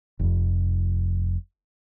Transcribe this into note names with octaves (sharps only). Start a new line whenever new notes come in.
F1 F2